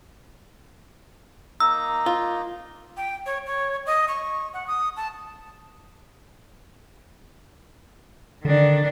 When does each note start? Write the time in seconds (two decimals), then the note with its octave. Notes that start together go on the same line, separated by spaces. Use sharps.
1.60 A#3 D#4 A#5 E6
2.06 F4
2.97 G5
3.26 C#5
3.46 C#5
3.86 D#5
4.08 C#6
4.53 F#5
4.67 D#6
4.97 A5
8.45 D3 D#3 D4